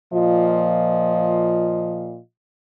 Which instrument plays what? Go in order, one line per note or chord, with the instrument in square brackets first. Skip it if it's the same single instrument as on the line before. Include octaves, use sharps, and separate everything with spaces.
[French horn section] A#2 F3 F4 D#5